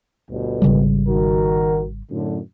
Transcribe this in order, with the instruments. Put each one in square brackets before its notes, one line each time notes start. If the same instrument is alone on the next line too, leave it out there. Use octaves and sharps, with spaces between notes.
[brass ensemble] G1 D2 B2
[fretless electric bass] G#1 C#3 G3
[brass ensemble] D#3 F#4 A#4
F#2 A2 D3